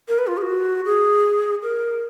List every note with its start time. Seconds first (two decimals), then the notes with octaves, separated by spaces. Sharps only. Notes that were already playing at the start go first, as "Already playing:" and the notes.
0.08 A#4
0.18 B4
0.27 F4
0.37 G#4
0.42 F#4
0.85 G#4
1.63 A#4